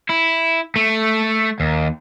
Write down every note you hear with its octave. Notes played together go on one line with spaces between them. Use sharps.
E4
A3
D#2